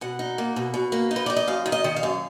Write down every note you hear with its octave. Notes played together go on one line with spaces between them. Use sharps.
B2 F#5
D#4
A#3
B2
B2
A#3
D#4
B4
D#4 D5
D#5
F#2 F5
D#3
D#5
D#3
F5
F#2